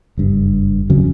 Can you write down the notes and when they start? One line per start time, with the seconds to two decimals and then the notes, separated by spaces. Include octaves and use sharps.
0.17 F#1 G2
0.89 F2 C#3 F#3